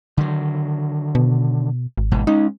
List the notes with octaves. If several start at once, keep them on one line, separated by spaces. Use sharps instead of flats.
D3 D#3 F#3
B2
G#1
E1 G#2 B2
G#3 C#4 D#4